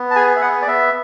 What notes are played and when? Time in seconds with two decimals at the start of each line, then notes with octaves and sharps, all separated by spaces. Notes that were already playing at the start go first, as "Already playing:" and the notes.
Already playing: B3
0.11 A5
0.16 G#4 G#5
0.36 E5
0.42 B3 F#5
0.62 D5
0.67 B3 E5